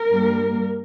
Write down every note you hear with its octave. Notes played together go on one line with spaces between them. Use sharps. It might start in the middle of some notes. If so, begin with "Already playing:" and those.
Already playing: A#4
G2 G3 A#3